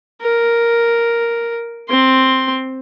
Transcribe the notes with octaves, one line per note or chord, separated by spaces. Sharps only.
A#4
C4 C6